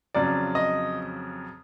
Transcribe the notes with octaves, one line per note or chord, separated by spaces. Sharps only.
F2 C#3 F#3 D5
D#5